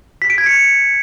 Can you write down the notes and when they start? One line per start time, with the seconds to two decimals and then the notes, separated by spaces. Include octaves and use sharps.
0.22 B6
0.30 D7
0.38 G#6
0.46 C#7